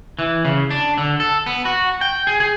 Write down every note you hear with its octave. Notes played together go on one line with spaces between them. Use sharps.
E3
C#3
D4
D3
A4
B3
F#4
G5
G#4
G#4